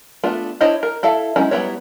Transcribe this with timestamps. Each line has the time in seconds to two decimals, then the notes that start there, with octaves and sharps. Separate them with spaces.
0.24 A3 B3 D4 F4
0.61 D4 E4 C5 C#5 D#5
0.83 A#4
1.03 E4 A4 E5 F5
1.36 F#3 G#3 C#4 D#4 E4
1.51 F#3 G3 B3 E4 C#5